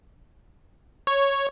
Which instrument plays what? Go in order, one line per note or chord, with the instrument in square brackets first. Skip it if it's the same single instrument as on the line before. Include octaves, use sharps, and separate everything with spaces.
[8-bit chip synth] C#5